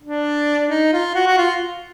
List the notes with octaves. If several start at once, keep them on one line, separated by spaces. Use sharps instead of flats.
D4
D#4
F4
F#4
F#4
F4